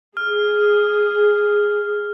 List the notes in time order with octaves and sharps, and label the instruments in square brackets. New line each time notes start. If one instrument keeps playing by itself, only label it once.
[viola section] G#4 [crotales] F6